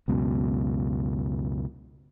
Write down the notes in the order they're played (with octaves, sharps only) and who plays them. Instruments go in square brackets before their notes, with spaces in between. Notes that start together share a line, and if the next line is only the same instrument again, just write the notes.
[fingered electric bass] C#2 F#2 B2